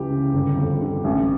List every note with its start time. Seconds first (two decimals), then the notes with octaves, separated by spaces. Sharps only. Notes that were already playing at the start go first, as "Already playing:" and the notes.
Already playing: C#2 E3 G4
0.10 C#3
0.34 G1
0.57 F2
0.81 D3
1.04 A1